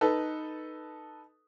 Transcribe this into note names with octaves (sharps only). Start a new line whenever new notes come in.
D#4 A4 B4